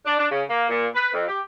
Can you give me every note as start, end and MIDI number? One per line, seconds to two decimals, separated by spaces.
0.06 0.16 62
0.19 0.27 62
0.31 0.43 49
0.48 0.68 58
0.69 0.87 46
0.94 1.09 71
1.14 1.25 41
1.28 1.40 67